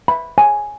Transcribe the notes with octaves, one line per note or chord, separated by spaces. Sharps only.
B5
G#5